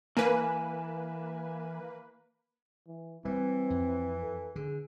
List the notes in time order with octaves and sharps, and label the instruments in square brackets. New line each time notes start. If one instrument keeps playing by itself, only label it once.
[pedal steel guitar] E3 G#5 [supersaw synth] A#3 B4
[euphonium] E3
[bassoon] E3 [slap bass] G3 [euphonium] C4
[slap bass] F2
[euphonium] A4
[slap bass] D3 [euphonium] G#4